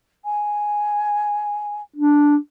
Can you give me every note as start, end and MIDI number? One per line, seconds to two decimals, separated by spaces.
0.24 1.81 80
1.96 2.36 62